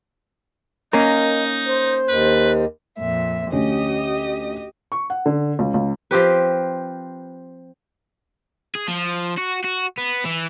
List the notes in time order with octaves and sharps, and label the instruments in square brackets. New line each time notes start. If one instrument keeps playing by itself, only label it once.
[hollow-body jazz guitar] A#3 C#4 A#4 [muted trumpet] D#4 [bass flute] D#5
[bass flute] C5
[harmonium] D#2 [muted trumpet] B4
[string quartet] F2 A#2 E5
[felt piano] D2 C#4 [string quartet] G4 D#5 D#6
[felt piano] C#6
F#5
D3
C#2
C#2
[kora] F3 C4 G4 B4
[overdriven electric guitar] G#4
F3
F#4
F#4
B3
E3